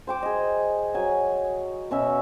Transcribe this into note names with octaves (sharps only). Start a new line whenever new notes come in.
C5 G5 D6
G#4 D#5
F#3 G#5
B2 C#4 E5